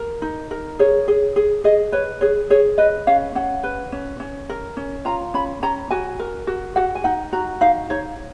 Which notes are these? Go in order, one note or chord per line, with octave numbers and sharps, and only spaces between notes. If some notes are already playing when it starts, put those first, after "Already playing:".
Already playing: A#4
D#4
A#4
G#4 C#5
G#4
G#4
G#4 D#5
B4 C#5
G#4 C#5
G#4 C#5
B4 D#5
C#4 F5
C#4 F#5
B4
C#4
C#4
A#4
C#4
F4 A#5
C#4 B5
C#4 A#5
F#4 G#5
A#4
F#4
F#4 F#5
G#5
D#4 F#5
F#4 A#5
D#4 F5
D#4 C#5